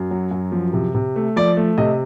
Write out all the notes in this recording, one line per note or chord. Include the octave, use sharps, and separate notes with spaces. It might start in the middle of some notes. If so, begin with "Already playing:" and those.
Already playing: F#2
F#3
F#2
F3
C3
C3
A3
F3 D5
A3
C3 D#5